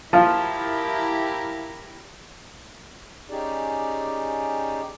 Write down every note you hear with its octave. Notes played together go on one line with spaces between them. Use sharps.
F3 E4 F4 G4 A#4
C#4 D#4 G4 G#4 D5